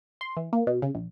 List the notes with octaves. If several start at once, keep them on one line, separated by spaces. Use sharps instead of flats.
C6
E3
A#3
B2
C#3
A#1